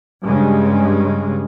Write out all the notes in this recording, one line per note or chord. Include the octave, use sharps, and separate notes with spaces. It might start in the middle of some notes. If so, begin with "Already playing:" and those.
G2 C#3 G#3